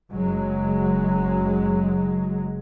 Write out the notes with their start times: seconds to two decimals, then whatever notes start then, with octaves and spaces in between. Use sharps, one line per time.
0.10 F#1 F#3 G#3